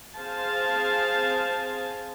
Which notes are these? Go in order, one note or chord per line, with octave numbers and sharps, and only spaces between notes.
C4 G#4 C5 F5 G#5 A5